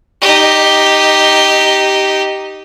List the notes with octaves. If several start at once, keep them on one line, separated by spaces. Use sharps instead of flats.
D#4 G4